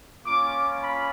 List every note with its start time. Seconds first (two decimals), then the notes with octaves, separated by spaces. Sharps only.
0.24 A#3 C#4 F4 D6
0.79 B5